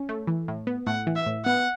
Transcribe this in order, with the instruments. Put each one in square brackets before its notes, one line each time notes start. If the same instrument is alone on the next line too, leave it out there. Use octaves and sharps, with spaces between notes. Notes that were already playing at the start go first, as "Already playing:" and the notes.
Already playing: [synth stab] C#4
A3
E3
A2
B3
[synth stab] A2 [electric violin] F#5
[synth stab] E3
[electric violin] E5
[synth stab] A2
[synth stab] B3 [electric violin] F#5